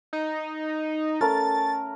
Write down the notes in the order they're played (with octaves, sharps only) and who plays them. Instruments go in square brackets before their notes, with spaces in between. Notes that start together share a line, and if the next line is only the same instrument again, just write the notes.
[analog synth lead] D#4
[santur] A3 C#4 A#4 [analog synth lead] A6